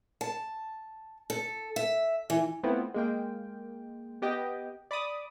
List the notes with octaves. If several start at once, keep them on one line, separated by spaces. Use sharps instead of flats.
A5
A4
E5
E3
A3 B3 C4 E4 F4
G#3 A#3 G5
B3 G4 D#5 G5
D5 B5 D6 D#6